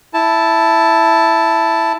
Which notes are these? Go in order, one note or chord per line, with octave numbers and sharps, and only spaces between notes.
E4 A5